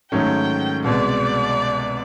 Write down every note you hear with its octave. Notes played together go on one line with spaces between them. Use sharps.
G#2 D#3 F#3 A3 C#4 G5
C2 B2 G#3 D5